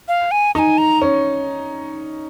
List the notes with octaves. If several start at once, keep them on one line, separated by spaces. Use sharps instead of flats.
F5
G#5
D#4 G#5 A#5
A#5
C#4